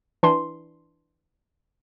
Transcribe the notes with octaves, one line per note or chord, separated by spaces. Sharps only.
E3 D4 C6